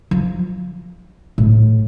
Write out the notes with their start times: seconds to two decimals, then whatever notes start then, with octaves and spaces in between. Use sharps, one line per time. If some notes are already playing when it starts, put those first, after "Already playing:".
0.11 F3
1.38 A2